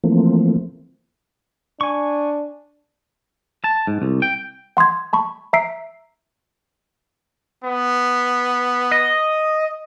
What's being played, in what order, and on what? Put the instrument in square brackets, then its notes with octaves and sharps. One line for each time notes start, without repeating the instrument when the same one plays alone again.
[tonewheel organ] E3 F3 A3 A#3 C4
[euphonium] D4 [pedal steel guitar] G#5 C#6
[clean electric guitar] A5
G#2
C2
G5
[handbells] F#5 C6 D#6 G#6
A5 B5 C#6
E5 A#5 E6 B6 C7 D7
[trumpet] B3
[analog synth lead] D#5